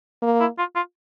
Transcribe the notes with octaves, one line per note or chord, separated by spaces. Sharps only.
A#3
E4
F4
F4